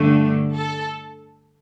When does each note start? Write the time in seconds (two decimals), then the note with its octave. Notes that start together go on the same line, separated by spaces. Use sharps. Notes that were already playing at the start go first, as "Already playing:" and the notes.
Already playing: G2 D3 A3
0.55 A4